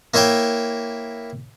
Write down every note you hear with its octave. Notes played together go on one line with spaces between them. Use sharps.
A#3 E4 C#5 E5 G5